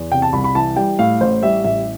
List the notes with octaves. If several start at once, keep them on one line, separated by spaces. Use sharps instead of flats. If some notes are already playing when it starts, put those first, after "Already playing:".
Already playing: E2
C3 G5
A5
C2 B5
B5
E3 A5
G3 G5
A2 F5
A1 C5
G3 E5
A1 E5